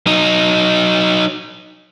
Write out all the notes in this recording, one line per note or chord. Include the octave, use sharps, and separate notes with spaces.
F#3 D#4